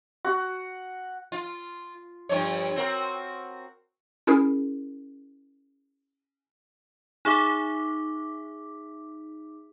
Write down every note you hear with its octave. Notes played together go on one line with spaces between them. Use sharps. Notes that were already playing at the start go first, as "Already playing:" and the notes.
F#4
F4
G2 F3 C#5
C4 F#4 A#4
C#4 E4 G#4 A#4
D#4 G#4 E5 D6 B6